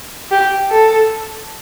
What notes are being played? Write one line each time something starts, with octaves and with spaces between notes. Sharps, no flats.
G4
A4